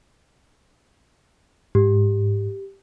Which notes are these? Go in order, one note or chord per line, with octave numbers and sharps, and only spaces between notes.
G#2 G4